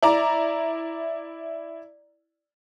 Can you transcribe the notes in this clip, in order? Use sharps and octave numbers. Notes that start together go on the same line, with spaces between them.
E4 D5 A#5